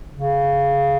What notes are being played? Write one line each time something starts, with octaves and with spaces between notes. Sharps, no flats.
C#3